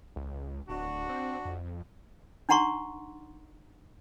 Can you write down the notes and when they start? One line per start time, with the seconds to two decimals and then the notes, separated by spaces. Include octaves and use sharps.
0.16 C#2
0.69 D1 D4 F#4
1.09 C4
1.45 F2
2.49 D4 D#4 F#5 A#5 C6 C#6